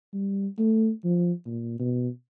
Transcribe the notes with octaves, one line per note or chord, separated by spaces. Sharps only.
G3
A3
F3
A#2
B2